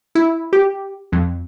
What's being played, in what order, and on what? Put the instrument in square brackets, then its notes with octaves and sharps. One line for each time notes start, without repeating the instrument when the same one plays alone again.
[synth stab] E4
G4
F2